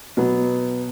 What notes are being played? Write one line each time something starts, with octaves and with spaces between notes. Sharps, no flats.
B2 F#3 B3